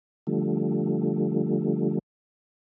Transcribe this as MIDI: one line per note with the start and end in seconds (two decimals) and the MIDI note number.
0.27 1.99 50
0.27 1.99 53
0.27 1.99 55
0.27 1.99 57